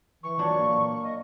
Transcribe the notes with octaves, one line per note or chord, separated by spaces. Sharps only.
E3 C#6
A#2 F#3 D4
A#3
D#5